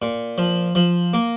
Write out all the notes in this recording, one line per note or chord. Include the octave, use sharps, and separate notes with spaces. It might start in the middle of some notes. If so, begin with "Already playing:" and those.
A#2
F3
F3
A#3